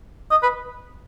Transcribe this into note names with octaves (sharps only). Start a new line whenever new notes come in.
D#5
B4